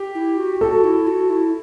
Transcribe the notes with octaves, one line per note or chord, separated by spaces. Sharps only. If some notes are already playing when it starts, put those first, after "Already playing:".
Already playing: G4
E4
F#4
F#4 A4
E4
F#4
E4